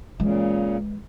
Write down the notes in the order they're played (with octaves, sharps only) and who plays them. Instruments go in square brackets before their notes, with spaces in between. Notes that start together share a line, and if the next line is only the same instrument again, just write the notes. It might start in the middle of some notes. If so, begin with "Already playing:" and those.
[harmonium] A#2 C#3 [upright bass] E3 G#3